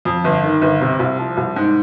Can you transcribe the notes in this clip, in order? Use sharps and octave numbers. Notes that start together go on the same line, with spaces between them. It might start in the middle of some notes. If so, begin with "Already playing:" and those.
F2
G1
D#3
G1
C3
C2
F3
C2
G#2